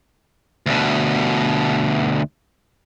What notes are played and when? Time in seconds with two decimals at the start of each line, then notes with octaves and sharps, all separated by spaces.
0.66 D2 B2